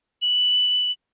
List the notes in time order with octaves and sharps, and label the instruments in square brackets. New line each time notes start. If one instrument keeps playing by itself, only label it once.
[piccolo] F#7